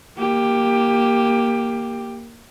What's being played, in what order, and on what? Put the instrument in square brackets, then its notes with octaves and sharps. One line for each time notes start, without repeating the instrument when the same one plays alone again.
[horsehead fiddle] A#3 G4